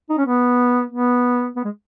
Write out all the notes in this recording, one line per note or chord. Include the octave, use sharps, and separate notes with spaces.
D#4
C#4
B3
B3
B3
G#3